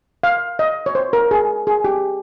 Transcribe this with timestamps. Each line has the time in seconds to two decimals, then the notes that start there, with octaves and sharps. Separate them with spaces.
0.23 F5
0.59 D#5
0.86 C#5
0.95 C5
1.13 A#4
1.31 G#4
1.67 G#4
1.84 G4